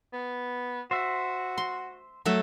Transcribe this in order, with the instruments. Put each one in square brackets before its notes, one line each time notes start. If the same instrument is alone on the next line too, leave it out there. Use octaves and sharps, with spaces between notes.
[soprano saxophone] B3
[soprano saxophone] F#4 [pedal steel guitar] C5 E5
[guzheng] C6
F#3 A3 E5